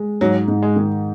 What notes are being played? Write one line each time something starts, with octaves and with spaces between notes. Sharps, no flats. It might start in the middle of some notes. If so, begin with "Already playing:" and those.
Already playing: G#3
G#2 F#3
G#2
G#3
D#3